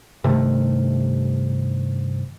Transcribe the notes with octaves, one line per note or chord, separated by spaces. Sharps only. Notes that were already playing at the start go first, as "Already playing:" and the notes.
G2 C3 D#3 A3